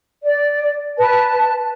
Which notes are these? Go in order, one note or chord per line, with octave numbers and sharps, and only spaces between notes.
D5
B4 A5